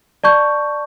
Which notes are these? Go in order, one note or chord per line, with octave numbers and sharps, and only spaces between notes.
D5 A5 C#6 G6